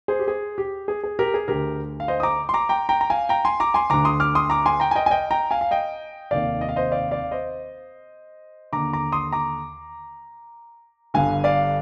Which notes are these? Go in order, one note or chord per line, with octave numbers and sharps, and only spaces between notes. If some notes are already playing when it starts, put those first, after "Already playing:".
G#4 C5
G4
G#4
G4
G#4
G#4
G4 A#4
G#4
D2 D3 G4 A#4
F5
C5 D#5
D#6
A#5 D6
C6
A#5 D6
G5 A#5
G5 A#5
A#5
F5 G#5
G5 A#5
G#5 C6
A#5 D6
G#5 C6
D2 D3 A#5 D6
C6 D#6
D6 F6
C6 D#6
A#5 D6
G#5 C6
G5 A#5
G#5
D#5 G5
G#5
D#5 G5
G5 A#5
F5 G#5
F5
D#5 G5
F1 D#2 D#3 D5 F5
D#5
F5
C5 D#5
D5 F5
D5 F5
C5 D#5
D#2 D3 A#5 D6
A#5 D6
C6 D#6
A#5 D6
G1 G2 D3 F5 G#5
D5 F5